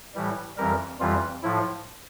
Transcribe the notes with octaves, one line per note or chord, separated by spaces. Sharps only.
A2 E3 G3
F2 E3 G3 A#4
F2 E3 G3 F4
A2 F3 E4